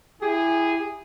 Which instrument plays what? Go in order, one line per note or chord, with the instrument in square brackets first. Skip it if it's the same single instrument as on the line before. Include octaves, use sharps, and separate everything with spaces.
[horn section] E4 G4 G#4